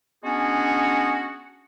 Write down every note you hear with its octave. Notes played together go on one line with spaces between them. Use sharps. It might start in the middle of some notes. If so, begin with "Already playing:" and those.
G#3 B3 C#4 D4 F#4 G#4